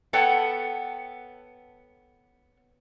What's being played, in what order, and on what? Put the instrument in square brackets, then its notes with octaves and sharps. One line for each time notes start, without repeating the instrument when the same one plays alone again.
[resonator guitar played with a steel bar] B3 A4 C#5 F#5 G5 A5